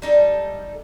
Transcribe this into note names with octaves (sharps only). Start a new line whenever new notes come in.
G3 D#4 A4